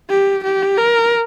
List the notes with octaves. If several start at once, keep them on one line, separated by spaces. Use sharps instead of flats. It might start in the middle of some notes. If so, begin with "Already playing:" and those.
G4
G4
A#4